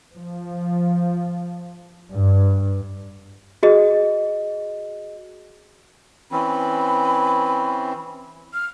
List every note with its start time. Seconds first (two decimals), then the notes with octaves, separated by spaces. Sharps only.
0.16 F3
2.12 G2
3.63 F#4 G#4 D#5
6.32 E3 C4 C#4 B5
8.53 F6